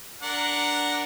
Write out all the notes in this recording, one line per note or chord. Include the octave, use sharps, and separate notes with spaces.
D4 A#4 F#5